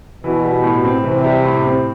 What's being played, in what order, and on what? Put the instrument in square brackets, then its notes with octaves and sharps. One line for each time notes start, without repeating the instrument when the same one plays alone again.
[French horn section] B2 [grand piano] E3
[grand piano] G3
A2
C4
[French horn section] C3 [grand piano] E3
[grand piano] G3
A2
C4